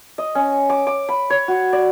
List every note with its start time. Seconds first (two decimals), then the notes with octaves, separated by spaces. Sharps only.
0.18 D#5
0.35 C#4
0.70 D6
0.87 D6
1.09 B5
1.30 C#5
1.48 F#4
1.73 D5